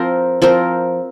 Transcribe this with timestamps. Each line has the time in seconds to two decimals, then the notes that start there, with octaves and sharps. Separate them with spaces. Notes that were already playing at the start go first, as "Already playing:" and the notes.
Already playing: F3 C4 A#4
0.42 F3 C4 A#4